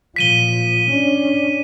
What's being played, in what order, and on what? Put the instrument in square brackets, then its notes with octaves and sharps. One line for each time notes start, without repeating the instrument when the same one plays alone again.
[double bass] A#2 F3 [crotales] B6 D#7 G7
[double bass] C#4 D4